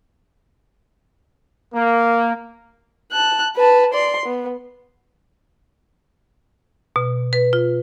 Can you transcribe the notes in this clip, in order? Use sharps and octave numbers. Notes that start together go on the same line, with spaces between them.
A#3
A5 F#6
B4 A5
D5 C6
B3
B2
B4
F4